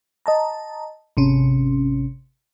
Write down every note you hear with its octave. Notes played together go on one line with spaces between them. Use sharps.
D#5 A5 A#5
G#1 C3 C#4